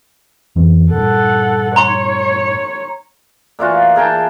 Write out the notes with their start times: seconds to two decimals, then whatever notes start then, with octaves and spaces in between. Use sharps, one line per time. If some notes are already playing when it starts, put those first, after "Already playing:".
0.56 F2 E3 C4
0.92 G2 A#2 A4 F#5
1.76 C#5 A#5 C6
3.59 A#2 E3 F4 F#4
3.96 G#4 A#4 G5 A5